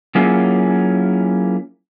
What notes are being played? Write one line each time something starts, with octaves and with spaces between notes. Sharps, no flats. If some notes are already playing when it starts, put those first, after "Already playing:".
F#3 A#3 C#4 E4 F4 G#4